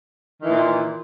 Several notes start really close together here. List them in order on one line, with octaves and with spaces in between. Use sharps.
D#3 E3 A#2